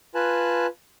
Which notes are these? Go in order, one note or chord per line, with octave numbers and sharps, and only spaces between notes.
F4 B4 G#5 A5 F#6